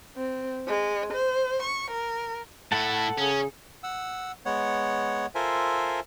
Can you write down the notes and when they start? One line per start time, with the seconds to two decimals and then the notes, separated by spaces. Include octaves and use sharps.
0.16 C4
0.69 G#3
1.14 C5
1.62 C#6
1.92 A#4
2.72 A2 E4 A4 F#5 A5
3.18 C#3 C#4 G#4
3.83 F#5 E6
4.46 G#3 B3 C#5 F#5
5.35 F4 A4 A#4 C5 E5 G#5